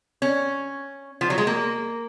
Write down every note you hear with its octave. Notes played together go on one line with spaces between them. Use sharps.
C#4
F3
F#3
G#3
A#3